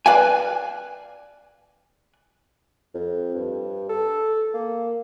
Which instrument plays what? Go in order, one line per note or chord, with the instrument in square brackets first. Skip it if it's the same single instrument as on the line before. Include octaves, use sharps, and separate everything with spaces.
[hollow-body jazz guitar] B4 D5 F5 G5 G#5
[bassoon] F2
G2
A4
A#3